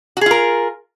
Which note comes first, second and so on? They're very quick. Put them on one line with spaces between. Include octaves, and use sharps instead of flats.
F#4 G#4 F4 A#4